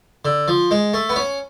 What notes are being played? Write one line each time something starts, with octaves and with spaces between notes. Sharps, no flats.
D3
F3
G#3
A3
B3
C#4